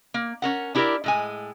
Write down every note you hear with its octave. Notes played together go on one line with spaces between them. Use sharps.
A#3
C#4 A#4 F#5
D4 E4 G4 A4 A#4 D5
A2 G#3 G#5